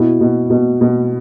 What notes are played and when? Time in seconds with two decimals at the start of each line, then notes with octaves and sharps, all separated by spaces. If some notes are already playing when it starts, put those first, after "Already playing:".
Already playing: B2 E4
0.20 B2
0.50 B2
0.81 B2